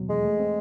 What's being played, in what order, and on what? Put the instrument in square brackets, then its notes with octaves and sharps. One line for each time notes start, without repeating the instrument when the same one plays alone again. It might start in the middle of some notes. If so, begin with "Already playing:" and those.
Already playing: [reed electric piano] D#2 B2 F#3
[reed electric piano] E2 [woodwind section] G#3
[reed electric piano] A3
C4